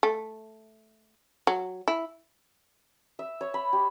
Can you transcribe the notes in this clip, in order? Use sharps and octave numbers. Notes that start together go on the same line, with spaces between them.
A3
F#3
E4
E5
C#5
B5
G4